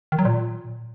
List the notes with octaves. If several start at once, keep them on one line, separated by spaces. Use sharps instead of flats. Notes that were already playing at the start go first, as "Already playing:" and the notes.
D#3
F#3
A#2